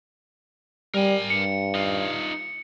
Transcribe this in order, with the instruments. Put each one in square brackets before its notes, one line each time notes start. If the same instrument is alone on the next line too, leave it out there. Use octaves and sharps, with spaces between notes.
[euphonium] G3 [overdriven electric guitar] A#4 G#5
[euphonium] G2 [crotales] C#7
[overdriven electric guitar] D#4 F4